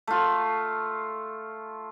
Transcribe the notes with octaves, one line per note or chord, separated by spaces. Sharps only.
A3 F4